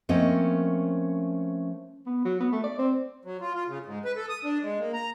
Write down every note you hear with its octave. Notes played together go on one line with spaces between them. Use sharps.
F3 A3 A#3 C4 C#4 D#5
B3
F#3
B3
A3
D5
C4
F#3
F4
F4
C#3
G#2
B4
A4
D#6
D4
G#3
A#3
A#5